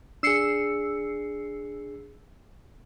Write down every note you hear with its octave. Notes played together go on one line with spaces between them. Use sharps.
D4 G#4 E6 C7 C#7